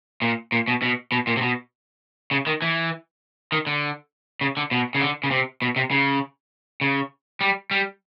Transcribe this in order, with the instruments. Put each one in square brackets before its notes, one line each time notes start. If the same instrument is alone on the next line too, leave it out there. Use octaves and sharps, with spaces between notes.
[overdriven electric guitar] A#2
A#2
B2
B2
B2
A#2
C3
B2
C#3
D#3
E3
D#3
D3
C#3
D3
B2
C#3
D3
C#3
C3
B2
C3
C#3
C#3
G3
G3